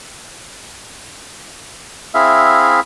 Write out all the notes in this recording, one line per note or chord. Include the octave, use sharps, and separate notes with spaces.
C4 E4 G#4 E5 F5